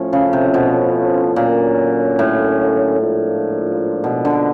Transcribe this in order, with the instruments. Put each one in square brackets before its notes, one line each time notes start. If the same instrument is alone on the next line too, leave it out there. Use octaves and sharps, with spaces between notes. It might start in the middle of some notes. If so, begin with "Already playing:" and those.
Already playing: [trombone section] A2 F3 A3 C#4 F4
[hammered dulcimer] C#3
C3
B2
[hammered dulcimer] A#2 [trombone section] D3 F#3 A#3 C#4
[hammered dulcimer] A2
[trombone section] G#2 F3 A#3 D4 F4
[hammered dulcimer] B2
D3